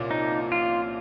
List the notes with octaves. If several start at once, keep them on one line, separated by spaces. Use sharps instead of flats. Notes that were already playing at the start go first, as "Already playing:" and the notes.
Already playing: C2 A#2 F3 C#4
D#4
F4